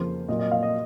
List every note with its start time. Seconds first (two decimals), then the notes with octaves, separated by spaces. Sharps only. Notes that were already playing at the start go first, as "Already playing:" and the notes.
Already playing: F2 C#3 F3 A#3 C5
0.28 A#2 F#3 A#3 D#5
0.39 D#5
0.51 F5
0.63 D#5